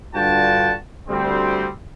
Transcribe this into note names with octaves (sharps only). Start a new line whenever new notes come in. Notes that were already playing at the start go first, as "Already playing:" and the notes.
G2 D3 F4 F#4 G5 A5
D2 G3 C4